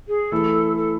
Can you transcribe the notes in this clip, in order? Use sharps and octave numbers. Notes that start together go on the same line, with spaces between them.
G#4
E3 A3 E4 A4
A4